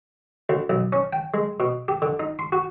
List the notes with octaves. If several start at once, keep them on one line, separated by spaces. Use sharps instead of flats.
D2
B1
C#4
G5
G#3
B2
G4
D3
D#4
C6
F#4